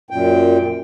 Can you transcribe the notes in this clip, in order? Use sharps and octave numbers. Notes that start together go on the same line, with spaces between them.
F#2 A#2 G5